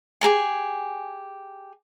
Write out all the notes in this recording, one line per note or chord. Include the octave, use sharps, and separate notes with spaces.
G4 G#4 A#4 G#5